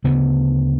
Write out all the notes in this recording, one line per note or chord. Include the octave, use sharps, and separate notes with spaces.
D2 C#3 B3